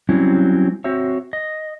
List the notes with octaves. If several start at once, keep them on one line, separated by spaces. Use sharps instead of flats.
F#3 G3 C4 C#4 E4
C4 F#4 C5 C#5 E5
D#5